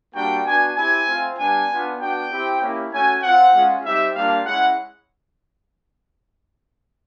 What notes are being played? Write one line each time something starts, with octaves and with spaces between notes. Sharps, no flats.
G3 A#3 D4 F#4 G5
B3 D4 F#4 G#5
C4 E4 G4 G#5
A3 C4 F4
G3 B3 D4 G#5
B3 D4 F4
B3 D4 F#4 G5
C4 E4 G4
A#3 C#4 E4 G4
A3 C#4 F#4 G#5
C4 F4 F#5
G#3 C#4 F4
G3 C4 D#4 G4 E5
G3 A#3 D4 F4 F5
G#3 C#4 E4 F#5